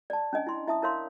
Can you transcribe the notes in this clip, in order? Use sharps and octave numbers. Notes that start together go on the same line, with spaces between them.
D5 A5
C#4 D4 D#5 G#5
E4 C6
E4 E5 A5 D#6
E4 A#4 C#5 F5 C6